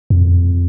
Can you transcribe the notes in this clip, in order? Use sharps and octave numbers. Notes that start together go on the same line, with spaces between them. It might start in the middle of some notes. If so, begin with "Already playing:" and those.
F2